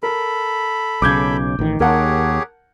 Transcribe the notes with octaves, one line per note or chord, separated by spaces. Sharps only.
A4 A#4 B5
B1 C#3 D6 G6 G#6
A1 D#3
D#2 G4 G#4 A#4 C#5 F#5 A5